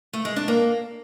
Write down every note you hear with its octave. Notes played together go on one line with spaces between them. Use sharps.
A3
G#3
D4
A#3